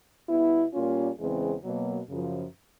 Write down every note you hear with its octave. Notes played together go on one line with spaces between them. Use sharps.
B2 G3 B3 E4
A#2 G3 A#3 C#4 F4
E2 C#3 E3 G#3 C4
B2 F#3 A#3
F#2 C#3 F3